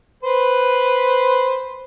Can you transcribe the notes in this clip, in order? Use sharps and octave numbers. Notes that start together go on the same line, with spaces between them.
B4 C5